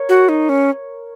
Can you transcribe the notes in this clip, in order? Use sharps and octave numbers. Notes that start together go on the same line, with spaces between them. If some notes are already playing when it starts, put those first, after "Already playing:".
Already playing: A#4 C#5
F#4
D#4
C#4